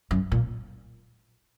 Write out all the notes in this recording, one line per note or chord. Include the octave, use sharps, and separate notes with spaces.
F#2
A#2